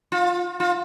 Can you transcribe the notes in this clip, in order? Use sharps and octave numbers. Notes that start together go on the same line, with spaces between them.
F4
F4